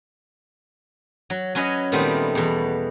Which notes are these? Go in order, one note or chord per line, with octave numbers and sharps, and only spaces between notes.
F#3
F#3 C#4 B4 C#5 D#5
A#2 D#3 G3 A3 B3 C4
E2 B2